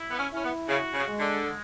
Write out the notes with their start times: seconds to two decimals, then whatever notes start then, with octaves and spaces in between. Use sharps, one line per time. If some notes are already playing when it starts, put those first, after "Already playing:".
Already playing: E4
0.11 B3
0.18 C#4
0.31 C#4 E4
0.44 B3
0.69 C#3 F#4
0.94 C#3
1.06 G#3
1.19 D3
1.44 G#3